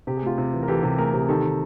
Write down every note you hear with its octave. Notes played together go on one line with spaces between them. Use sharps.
C3 G4
G#4
A3 F4 G4
C3
E3
A#4
E3 G4 A4
C3
A3 G#4 A#4
C3
G#4
D#3 G4 A4
D#3